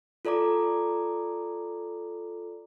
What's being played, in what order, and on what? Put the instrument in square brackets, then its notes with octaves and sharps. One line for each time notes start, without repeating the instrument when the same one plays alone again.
[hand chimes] F4 A4 D5 A#5 D6